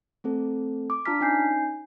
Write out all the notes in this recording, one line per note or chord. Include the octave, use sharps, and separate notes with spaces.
A3 C4 A4
D6
D4 F4 A5 A#5 F6 B6
C#4 D#4 G#5 G6 C7